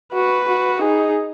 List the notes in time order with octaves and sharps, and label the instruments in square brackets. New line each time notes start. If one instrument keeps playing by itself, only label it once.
[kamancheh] F#4 [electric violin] B4
[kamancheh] F#4
[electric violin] D#4 [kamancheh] G#4